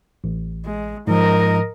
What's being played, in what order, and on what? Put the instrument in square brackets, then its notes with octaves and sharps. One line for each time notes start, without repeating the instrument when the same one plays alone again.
[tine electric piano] A1
[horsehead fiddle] G#3
[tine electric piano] G#2 F3 [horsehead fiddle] A#4 D#5